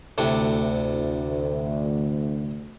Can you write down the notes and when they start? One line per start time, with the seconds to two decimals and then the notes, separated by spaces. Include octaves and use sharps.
0.18 D2 A2 C3 D4